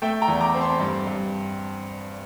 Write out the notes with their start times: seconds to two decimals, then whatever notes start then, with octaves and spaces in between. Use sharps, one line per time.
0.02 A3 E5 G5
0.22 G5 A#5
0.28 E2
0.41 A#5 D6
0.54 C4
0.61 A5 C6
0.80 G2
1.07 G2